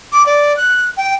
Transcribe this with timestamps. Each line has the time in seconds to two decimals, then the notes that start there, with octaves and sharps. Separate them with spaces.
0.12 D6
0.26 D5
0.57 F#6
0.97 G5